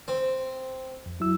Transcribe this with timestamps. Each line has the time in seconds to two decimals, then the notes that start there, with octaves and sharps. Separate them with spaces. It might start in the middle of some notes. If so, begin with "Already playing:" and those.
0.08 C4
1.06 F2
1.20 F#3 E4 E6